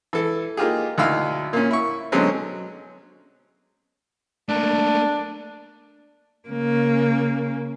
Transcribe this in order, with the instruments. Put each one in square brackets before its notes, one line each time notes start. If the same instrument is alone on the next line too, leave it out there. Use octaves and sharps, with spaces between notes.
[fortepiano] E3 A4
A#3 D#4 F4 G4 G#4
D2 D#4 E4 F5 E6
A#2 C#4
E4 C#6
B2 D3 F#3 G#3 C4 C#4
[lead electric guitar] A3 A#3 [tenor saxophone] D4
[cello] C#3 A#3